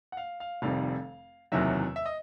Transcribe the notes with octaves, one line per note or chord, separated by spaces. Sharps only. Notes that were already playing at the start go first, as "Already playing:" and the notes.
F#5
F5
F5
F1 F2 C3 D#3 G3 F5
F#1 E2 C3 D#3 F#3 E5
E5
D#5